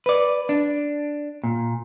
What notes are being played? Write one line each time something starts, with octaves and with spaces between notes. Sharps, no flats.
B4 D5
D4
A#2